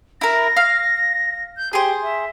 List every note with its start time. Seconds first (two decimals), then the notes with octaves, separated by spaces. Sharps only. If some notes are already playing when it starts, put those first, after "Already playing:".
0.21 E4 A#4 A#6
0.56 F5
1.57 G6
1.73 G4 G#4 C5
2.02 E5